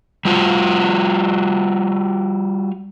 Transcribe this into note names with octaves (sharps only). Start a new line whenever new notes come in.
G3 F4 F#4